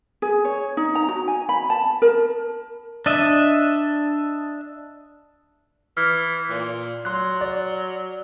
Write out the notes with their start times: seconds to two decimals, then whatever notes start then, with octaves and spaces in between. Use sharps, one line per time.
0.22 G#4
0.45 C#5
0.77 D#4
0.95 A#5
1.09 F#4
1.28 G#5
1.49 B5
1.70 A5
2.02 A#4
3.06 D4 D#5 E5
5.97 E3 F6
6.50 A#2
7.05 F#3 C6 F#6
7.41 D5